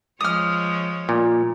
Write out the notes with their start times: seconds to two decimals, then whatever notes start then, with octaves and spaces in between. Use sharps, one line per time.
0.21 F3 G#3 C#5 D#6 F6
1.09 A#2